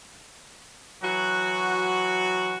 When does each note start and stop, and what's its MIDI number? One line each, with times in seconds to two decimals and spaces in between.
1.02 2.58 52
1.02 2.58 54
1.02 2.58 66